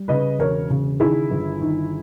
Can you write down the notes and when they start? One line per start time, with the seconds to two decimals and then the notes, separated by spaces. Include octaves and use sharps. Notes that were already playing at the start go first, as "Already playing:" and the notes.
Already playing: G3
0.08 C#3 B4 D#5
0.39 E1 A#4 C#5
0.70 C#3
1.00 D#3 E4 G#4
1.31 G1
1.61 D#3